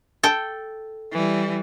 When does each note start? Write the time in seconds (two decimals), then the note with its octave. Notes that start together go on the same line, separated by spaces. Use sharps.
0.23 A4 G5
1.12 E3 G3